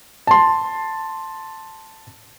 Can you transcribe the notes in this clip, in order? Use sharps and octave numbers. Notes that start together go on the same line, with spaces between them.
A5 C6